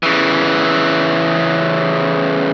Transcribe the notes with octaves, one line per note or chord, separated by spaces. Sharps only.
C#3 E3